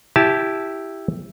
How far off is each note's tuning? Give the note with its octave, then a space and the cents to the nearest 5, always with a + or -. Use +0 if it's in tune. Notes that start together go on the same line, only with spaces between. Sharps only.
E4 +0 G4 +0 A5 -20